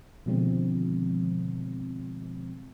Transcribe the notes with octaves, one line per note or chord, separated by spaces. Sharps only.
B2 D3 D#3 F3 G#3 C4